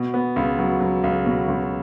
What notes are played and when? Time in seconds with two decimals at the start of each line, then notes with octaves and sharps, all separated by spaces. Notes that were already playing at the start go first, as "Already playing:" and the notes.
Already playing: B2
0.14 B3
0.36 C#2
0.59 F#3
0.80 F#3
1.04 C#2
1.26 B2
1.48 C#2